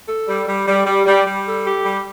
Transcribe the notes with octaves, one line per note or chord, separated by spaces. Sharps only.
A4
G3
G3
G3
G3
G3
G3
A4
G4
G3